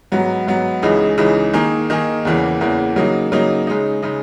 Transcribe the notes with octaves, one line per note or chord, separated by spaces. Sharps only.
G#2 F#3 B3
G#2 F#3 B3
C#2 C#3 E3 G#3 D#4
C#2 C#3 E3 G#3 D#4
D#3 A#3 D#4 G#4
D#3 A#3 D#4 G#4
E2 C#3 E3 A#3
E2 C#3 E3 A#3
C#3 F#3 A#3 D#4
C#3 F#3 A#3 D#4
C#3 G#3 D#4
C#3 G#3 D#4